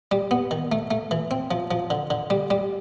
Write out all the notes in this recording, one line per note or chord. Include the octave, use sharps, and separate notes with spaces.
G3
B3
D#3
A3
A3
E3
C4
F3
F3
D3
D3
G3
G3